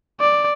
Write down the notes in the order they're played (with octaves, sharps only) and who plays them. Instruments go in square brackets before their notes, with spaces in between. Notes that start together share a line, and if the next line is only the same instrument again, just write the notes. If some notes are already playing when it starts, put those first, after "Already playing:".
[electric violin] D5